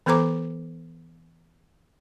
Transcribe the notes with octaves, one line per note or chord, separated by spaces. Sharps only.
E3 B3 A4 C5 A#5 D6